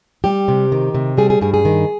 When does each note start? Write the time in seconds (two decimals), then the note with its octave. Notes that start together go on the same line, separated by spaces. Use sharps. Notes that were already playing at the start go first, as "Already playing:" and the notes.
0.24 G3 G4
0.48 C3
0.72 D#3
0.95 C3
1.18 G3 G#4
1.30 G#4
1.41 G2 G#4
1.54 G#4
1.65 D#3